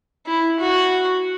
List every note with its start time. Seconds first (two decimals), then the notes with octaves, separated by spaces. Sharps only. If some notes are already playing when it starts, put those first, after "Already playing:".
0.26 E4
0.60 F#4